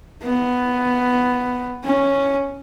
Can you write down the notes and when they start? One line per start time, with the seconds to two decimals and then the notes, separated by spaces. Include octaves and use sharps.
0.23 B3
1.84 C#4